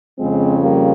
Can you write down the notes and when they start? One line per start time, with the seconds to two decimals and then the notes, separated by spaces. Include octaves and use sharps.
0.19 F2 C#3 F3 G#3 C4
0.61 G3 A#3